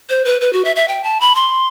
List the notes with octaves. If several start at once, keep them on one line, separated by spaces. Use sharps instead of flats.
C5
B4
B4
F#4
E5
E5
G5
A5
B5
C6